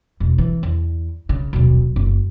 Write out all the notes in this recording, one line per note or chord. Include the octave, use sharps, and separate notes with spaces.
E1
E3
E2
C#3
D#1 B1
F#1